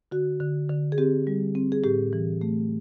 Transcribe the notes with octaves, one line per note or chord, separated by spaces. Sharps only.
D3 F#4
D3
D3
G#4
C4 G4
G3
C4
G#4
A2 G4
E3
A3